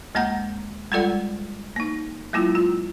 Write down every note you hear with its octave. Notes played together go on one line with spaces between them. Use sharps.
D2 G#3 A#3 F#5 A#5 G6
G3 G#3 F4 A4 D5 F#5
A#3 D#4
F#3 G#3 A#3 E4 F4
F4